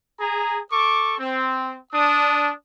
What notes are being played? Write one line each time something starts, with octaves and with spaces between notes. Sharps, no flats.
G#4 A#5
A4 C#6 D6
C4
D4 D#6